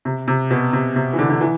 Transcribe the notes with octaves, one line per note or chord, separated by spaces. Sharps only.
C3
C3
B2
C3
C3
E3
D3
D3
E3